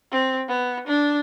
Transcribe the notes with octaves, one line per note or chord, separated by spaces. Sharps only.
C4
B3
D4